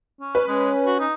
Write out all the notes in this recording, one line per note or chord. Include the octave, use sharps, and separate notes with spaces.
C#4
B4
G#3 C#4
F#4
D#4